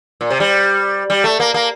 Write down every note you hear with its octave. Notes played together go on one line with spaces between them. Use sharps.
A#2
C3
G3
G3
A3
A#3
A#3